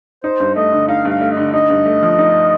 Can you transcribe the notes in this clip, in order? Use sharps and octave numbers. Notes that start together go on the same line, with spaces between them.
D#4 C5
G2
A3 D#5
D3
D#4 F5
G2 F5
A3
D#5
D3
D#4 D#5
G2
A3
F3
D#4